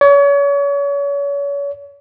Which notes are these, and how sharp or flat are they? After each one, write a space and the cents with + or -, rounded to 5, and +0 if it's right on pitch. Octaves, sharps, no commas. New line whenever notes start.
C#5 +35